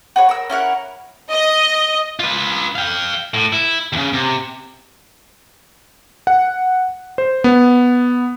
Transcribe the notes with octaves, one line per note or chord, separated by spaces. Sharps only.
F#4 B4 C#5
A#4 E6
C#4 E4 A#4 F#5
D#5
F4 B4
F5 G5
A2
E4
D#2 C#3
C3
F#5
C5
B3